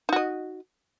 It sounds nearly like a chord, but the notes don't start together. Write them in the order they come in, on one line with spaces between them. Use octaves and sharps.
D#4 F#4 D#5